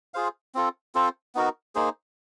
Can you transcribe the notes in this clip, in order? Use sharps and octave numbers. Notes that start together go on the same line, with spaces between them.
F4 G#4 C5 F5
C4 F4 A4
C4 F4 A4 C5
B3 D#4 F#4 A#4
A#3 D#4 G#4 C5